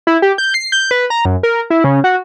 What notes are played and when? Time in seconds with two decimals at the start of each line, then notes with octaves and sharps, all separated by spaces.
0.07 E4
0.22 G4
0.38 G6
0.54 C7
0.72 G6
0.91 B4
1.10 A#5
1.25 F#2
1.43 A#4
1.70 E4
1.84 C#3
2.04 F#4